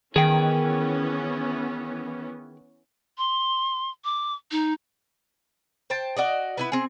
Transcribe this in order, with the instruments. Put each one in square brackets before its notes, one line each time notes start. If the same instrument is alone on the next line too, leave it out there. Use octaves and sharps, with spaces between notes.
[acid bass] D#3 [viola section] E3 B3 C#4 [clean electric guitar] G#4 G5
[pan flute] C6
D6
D#4
[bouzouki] C5 G5 A5
F#4 D5 D#5
B3 E4 B4
C4 G#4